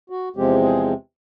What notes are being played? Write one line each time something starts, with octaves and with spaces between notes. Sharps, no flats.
F#4
E2 C3 F3 G#3 C4 G4
G#4